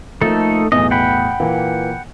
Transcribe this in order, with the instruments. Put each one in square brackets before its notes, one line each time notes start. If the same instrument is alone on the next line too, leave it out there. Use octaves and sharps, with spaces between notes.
[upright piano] F3 A#3 [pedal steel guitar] A3 D#4 A4
[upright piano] B1 E2 A2 [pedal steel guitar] D#5
[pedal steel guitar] F#5 G5 B5
[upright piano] A#2 E3 A#3